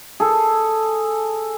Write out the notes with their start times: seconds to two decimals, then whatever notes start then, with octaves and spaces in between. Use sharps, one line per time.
0.20 G#4 A4